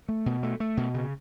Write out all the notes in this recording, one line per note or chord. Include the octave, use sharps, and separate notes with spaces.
A3
B2
A3
A3
B2
C#3